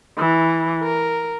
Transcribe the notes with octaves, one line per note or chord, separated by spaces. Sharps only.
E3
A#4